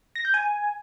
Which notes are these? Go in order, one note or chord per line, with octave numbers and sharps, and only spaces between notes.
A#6
G6
G#5